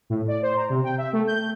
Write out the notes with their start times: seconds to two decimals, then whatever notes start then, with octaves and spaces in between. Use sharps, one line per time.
0.10 A2
0.28 D5
0.42 C5
0.57 A#5
0.70 C3
0.84 G5
0.98 E5
1.13 A3
1.27 G6